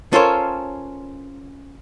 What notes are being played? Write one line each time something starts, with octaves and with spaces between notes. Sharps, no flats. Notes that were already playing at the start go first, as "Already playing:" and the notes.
C#4 F4 A4 A#4 C5 C#5